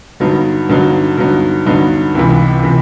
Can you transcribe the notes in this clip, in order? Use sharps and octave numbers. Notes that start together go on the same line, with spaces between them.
G2 D3 F#3 B3 D#4
G2 D3 F#3 B3 D#4
G2 D3 F#3 B3 D#4
G2 D3 F#3 B3 D#4
C#2 C3 E3
C3 E3